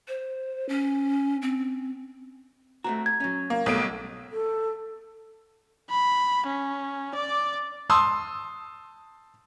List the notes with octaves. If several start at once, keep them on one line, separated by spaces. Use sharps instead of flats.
C5
C#4
C4
A3 C4 F#4 A#5
G#6
F#3 C#4
A#3
B1 G3 A3 C4 A4 C#5 D#6 D7
A4
B5
C#4
D5 D6
A5 C6 D#6 E6